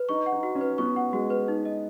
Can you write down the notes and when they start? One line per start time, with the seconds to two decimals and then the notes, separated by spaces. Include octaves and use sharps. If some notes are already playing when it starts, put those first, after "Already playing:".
Already playing: B4
0.09 D#4 C#6
0.26 F#5
0.32 D#4
0.43 F#4
0.55 C#4
0.61 B4
0.78 B3 C#6
0.96 F#5
1.13 G#3 F#4
1.30 B4
1.48 D#4
1.65 D#5